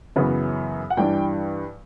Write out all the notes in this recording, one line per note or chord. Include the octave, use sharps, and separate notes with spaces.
F#2 C#3 E3 B3
F#5
G2 E3 G3 D4 G5